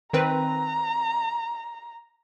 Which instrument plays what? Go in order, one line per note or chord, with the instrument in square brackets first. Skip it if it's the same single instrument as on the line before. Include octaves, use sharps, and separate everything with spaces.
[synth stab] D#3 C4 B4 [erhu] A#5